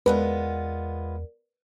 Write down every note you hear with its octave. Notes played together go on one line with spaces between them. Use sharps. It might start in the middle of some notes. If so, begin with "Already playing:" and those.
E2 G#3 B3 F4 A#4 B4 D5